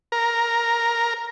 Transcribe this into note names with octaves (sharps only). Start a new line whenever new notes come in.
A#4